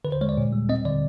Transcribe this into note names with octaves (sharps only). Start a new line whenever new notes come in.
D3 B4
C5
G#3 C#5
D5
A#2
G3
C4 D#5
D3 D5